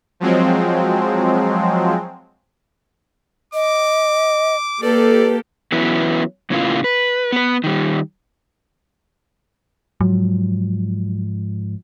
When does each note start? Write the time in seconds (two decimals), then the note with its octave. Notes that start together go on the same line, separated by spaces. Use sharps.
0.20 F3 F#3 G#3 C4
3.54 D#5 D6
4.83 A#3 G4 A4 B4 D5
5.72 E3 F#3 B3 C#4 E4 B4
6.50 E2 A2 C#3 E3 A#3 F4
6.84 B4
7.32 B3 B4
7.64 D#3 G3
10.01 G#2 F3 F#3